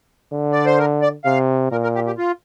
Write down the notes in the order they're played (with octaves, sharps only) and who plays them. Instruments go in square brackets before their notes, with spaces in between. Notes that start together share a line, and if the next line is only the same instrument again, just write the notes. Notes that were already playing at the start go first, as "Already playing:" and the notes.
[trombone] D3
[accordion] D5
C5
A#4
D5
[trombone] C3 [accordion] F5
[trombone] A#2 [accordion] A#4
[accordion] A#4
G4
G4
F4